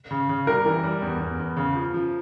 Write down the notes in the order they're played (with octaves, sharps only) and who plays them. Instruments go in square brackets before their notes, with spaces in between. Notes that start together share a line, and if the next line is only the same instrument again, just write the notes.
[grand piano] C#3
C#3
[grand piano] G3 [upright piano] A#4
[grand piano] E3
G3
E2
E2
E2
C#3
F3
F3